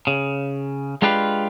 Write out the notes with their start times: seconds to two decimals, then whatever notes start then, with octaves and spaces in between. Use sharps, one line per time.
0.07 C#3
1.02 G#3 D4 F4 G4 B4 F5